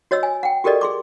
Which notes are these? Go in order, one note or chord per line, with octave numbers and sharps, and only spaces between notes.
F#4 C#5 D#5 E6
G#5
F#5 G5
F#4 G4 A4 A#4 D5 D#5
G#4 C6 D6